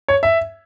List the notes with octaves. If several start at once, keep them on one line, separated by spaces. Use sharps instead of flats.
C#5
E5